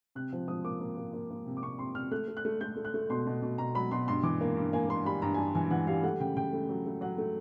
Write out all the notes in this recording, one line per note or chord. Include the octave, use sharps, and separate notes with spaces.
C3 F#6
F3
F3 D#6
A#3 D6
A#3
A#3
A#3
A#3
C3
D6
C3 C#6
C3 C6
C3 F6
A3 F#6
A3
F#6
A3
A3 G6
A3
F#6
A3
B2 C6
B2
B2
B2 A#5
F#3 B5
B2 C6
G2 C6
E3 D6
A#3
G2
A#3 G#5
A#3 C6
G3 B5
G2 A#5
G#5
G3 A5
E3 G#5
E3 F#5
G3 F5
A3 F#5
C#3 G5
C#3 G5
A3
F#3
A3
F#3 F#5
A3